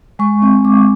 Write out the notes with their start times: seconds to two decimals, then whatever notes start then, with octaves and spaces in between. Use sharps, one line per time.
0.19 G#3 C#6
0.42 C4
0.65 G#3 D6